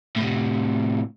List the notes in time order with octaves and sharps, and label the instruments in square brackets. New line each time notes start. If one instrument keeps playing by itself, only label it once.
[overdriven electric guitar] A2 C3